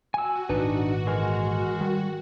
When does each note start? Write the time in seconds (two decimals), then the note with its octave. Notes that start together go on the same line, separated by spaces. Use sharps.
0.14 F#4 G#5 E6
0.49 G#1 A#2 D4 D#4 B4
1.07 E3 G#3 A#4
1.81 D#3 G3